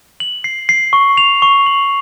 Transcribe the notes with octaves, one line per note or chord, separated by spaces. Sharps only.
F#7
C7
C7
C#6
F7
C#6
F#7